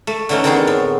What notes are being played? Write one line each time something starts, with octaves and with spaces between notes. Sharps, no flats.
A3
D3 E3 A3 C#4 D#4
D3 D#3 B3 C4 D#4 G#4
A2